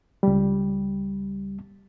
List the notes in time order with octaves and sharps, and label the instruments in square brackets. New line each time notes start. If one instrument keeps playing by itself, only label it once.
[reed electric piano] C#2 G3